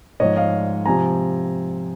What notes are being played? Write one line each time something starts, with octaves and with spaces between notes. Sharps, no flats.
G#2 F3 C#5 D#5
D#5 F5
C3 F3 G#5 A#5